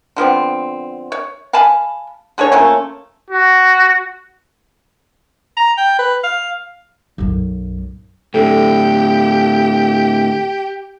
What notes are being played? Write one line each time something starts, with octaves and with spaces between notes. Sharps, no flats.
D3 F3 B3 C4
C#5
F5 G#5 A5 B5
D3 G#4 A4 C#5
F3 A3 A#3 C#4
F#4
A#5
G5
B4
F5
B1 F#2
A2 D3 G4 A4